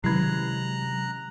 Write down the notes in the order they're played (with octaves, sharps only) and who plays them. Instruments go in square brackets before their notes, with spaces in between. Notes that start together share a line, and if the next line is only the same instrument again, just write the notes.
[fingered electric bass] C3 G#3 C#4 [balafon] D#3 E4 [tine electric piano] F#3 [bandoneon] A#5 F#6